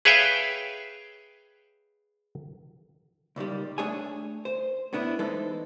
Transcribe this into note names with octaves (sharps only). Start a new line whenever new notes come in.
G#4 B4 C#5 E5 F5 G5
C#2 A#2 D#3 G3
A3 D4 G#4 C#5 G#5
C5
A2 B3 D4 E4
E3 G#3 D#4 A4 B4 C5